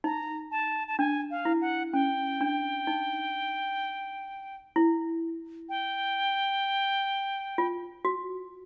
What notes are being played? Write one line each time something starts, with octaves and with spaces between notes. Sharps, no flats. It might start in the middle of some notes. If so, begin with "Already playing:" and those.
D#4 A#5
A5
A5
D4 G#5
F5
E4
F#5
C#4 G5
D4
D#4
E4
G5
F4
F#4